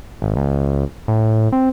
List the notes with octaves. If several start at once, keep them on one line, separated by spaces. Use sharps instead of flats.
G#1
C#2
A2
C4